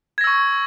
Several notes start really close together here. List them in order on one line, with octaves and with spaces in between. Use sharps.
G#6 A#6 E6 C#6